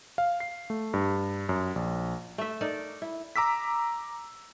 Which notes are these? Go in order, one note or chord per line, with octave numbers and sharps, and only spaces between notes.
F5
C7
A3
G2
F#2
A#1
A3 E5
D#4 A4 A#4 D5
E4
A#5 D6 E6 B6